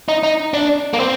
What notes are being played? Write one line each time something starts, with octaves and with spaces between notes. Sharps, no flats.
D#4
D#4
D4
A#3
C4